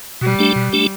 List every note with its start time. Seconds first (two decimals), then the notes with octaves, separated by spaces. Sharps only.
0.21 B2 G3
0.39 A3 D4 G4
0.56 B2
0.73 A3 D4 G4